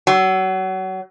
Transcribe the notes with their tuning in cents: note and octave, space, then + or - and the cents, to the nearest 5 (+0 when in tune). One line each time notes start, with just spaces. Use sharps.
F#3 +30